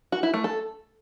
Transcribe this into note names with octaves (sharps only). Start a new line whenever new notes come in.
F#4
E4
A3
A4